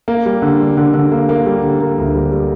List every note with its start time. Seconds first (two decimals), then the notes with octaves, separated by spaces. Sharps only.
0.08 A#3
0.26 G3
0.42 D3
0.60 G3
0.77 D3
0.94 D3
1.12 A#3
1.29 A#3
1.46 G3
1.63 D3
1.81 A#3
1.98 D2
2.15 G3
2.32 G3